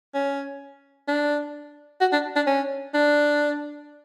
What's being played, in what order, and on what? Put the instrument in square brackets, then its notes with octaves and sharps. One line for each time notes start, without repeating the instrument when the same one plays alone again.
[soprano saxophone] C#4
D4
F#4
D4
D4
C#4
D4